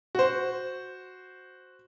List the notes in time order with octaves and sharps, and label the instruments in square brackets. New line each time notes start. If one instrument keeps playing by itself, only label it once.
[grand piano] F#4 C5